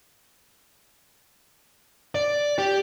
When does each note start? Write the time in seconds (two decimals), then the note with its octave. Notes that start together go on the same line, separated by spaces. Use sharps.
2.15 D5
2.58 G4